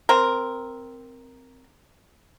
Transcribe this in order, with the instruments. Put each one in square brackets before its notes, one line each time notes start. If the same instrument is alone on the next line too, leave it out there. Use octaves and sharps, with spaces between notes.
[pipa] C4 A#4